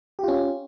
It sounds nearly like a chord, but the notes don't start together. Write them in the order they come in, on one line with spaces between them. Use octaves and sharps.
G4 F4 C#4